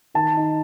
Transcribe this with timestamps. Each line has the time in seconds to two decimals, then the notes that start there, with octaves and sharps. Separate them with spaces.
0.14 D#3 A5
0.37 D#4